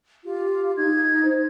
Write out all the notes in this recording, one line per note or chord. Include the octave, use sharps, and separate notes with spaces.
F4 G4
D#4 G#6
C5